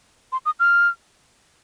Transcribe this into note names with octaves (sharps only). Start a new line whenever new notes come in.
C6
D#6
F6